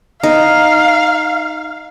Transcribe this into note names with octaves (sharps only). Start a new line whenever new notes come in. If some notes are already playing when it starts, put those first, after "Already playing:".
D#4 F5